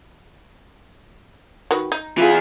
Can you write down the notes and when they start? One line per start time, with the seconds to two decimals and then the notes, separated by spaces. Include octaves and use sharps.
1.71 D#3 F#4 B4
1.92 D#4
2.18 E3 F4 G#4